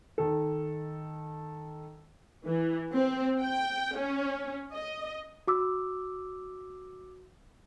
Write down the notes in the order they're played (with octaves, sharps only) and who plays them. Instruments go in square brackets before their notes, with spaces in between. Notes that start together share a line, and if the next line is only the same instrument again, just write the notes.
[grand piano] D#3 A4
[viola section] E3
C4
G5
C#4
D#5
[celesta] F#4 D6 E6